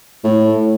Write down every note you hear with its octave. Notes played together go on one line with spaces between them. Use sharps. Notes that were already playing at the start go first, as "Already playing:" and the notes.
A2